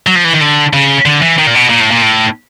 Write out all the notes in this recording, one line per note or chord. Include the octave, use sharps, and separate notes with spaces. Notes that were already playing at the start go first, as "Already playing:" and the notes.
F#3
F3
E3
D#3
D3
C#3
D3
E3
D#3
A#2
B2
A#2
A2
A#2
A2